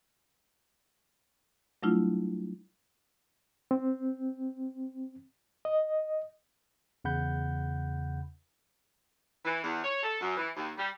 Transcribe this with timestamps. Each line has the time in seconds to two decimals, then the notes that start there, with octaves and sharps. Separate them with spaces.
1.83 F#3 G3 A3 D4 E4 F4
3.71 C4
5.65 D#5
7.04 E2 C#3 F#5 B5 G6
9.45 E3
9.64 E2
9.84 C#5
10.03 A4
10.21 F#2
10.37 E3
10.56 D#2
10.78 G3